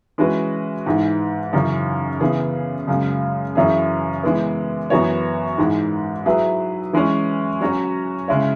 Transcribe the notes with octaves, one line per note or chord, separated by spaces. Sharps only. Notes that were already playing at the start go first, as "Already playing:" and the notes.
E3 G#3 C#4 F#4 B4
G#2 E3 G#3
F#2 C#3 E3 C#4
C#3 E3 B3 G#4
F#2 C#3 G#3
F#2 E3 C#4 E4 G#4
E3 G#3 B3
F#2 E3 B3 F#4 C#5
G#2 E3 G#3
F#3 E4 G#4 B4
E3 G#3 C#4
F#3 C#4 F#4 C#5
C#3 G#3 E4 C#5